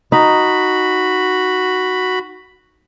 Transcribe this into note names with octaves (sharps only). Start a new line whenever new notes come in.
D#4 F#4 B5